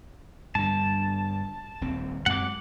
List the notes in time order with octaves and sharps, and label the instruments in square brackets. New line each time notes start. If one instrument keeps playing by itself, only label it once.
[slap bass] G2 D3 [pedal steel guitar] A5
[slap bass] D#1 D#2 C4
[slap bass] F#2 G#3 C4 [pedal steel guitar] F#5 D6